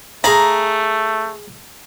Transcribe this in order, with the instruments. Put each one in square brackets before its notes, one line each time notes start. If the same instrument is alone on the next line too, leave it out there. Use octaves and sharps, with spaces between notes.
[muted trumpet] A3 [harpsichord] G#4 F5 B5 [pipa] A#5